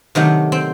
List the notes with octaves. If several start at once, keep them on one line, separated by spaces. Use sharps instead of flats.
C3 D#3 F#3 A3
C4